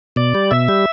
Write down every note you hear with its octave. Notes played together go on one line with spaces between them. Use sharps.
B2 D5
G3
B2 E5
G3